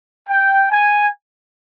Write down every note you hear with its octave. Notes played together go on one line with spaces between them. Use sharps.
G5
G#5